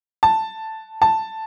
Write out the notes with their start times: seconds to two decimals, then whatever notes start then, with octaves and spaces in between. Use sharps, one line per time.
0.23 A5
1.02 A5